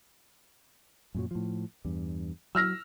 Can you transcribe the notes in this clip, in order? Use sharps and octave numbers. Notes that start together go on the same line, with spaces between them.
F#2 A#2 F#3
A2 F3
E2 G2
F#3 E6 F6 A#6